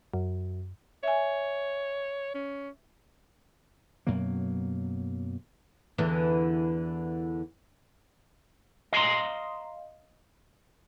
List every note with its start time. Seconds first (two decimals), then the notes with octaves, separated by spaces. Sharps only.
0.14 F#2
1.03 C#5 E5 G#5
2.35 C#4
4.07 F#2 B2 F#3 A#3
5.98 E2 D3 E3
8.93 D#5 F5 G#5 A#5 C6